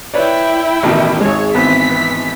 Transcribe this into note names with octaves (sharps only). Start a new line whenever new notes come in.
E4 B4 C#5 D5 G5
A1 B2 D#3
G#1 G#3 G#4 C#5
G#1 E3 B3 C4 B6